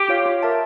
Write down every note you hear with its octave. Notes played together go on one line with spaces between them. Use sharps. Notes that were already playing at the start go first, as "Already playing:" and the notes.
Already playing: G4
F4 C#5 F5
F4
A#4 E5 A5